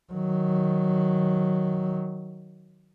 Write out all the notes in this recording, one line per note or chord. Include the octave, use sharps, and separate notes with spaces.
D#3 F#3